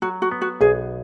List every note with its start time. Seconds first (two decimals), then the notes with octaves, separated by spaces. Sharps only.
0.02 F#3 F#4
0.22 F#4
0.31 B3
0.41 F#4
0.61 B1 G#4